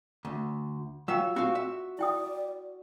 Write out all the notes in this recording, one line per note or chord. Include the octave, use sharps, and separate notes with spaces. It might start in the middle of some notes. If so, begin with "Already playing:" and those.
D2
F#3 F4 E5 F5 G5 E6
C4 F#4 F5
E5
E4 D5 G5 D#6